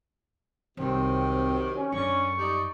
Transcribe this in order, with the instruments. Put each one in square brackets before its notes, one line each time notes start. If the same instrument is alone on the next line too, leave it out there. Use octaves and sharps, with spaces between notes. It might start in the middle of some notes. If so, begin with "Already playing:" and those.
[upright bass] C2 [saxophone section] C3 D#3 F#3 [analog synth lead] C4
[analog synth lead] C#4
[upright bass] F#2 [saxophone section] D3 C#4 [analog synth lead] C#6
[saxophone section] G3 D#4 D5